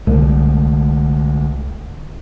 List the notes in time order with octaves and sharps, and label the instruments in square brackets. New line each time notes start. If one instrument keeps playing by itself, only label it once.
[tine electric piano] C2 [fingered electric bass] D3 G#3 A3